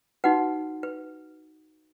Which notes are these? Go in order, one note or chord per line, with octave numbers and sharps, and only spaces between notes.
D#4 F#4 B4 F#5
B4